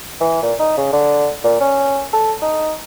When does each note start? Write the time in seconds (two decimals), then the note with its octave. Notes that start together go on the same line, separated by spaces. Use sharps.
0.20 E3
0.42 A#2
0.59 D#4
0.77 C#3
0.93 D3
1.44 A#2
1.60 C#4
2.13 A4
2.42 D#4